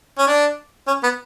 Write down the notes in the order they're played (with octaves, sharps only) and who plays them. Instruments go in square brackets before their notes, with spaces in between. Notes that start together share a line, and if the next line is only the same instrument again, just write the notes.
[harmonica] C#4
D4
C#4
B3